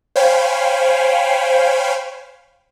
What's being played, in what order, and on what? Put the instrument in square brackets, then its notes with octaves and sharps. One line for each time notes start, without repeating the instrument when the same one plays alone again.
[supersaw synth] C5 C#5 F5 G5 G#5 B5